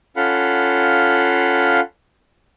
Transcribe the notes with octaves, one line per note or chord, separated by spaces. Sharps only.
C#4 F4 A4 F5 F#5 B5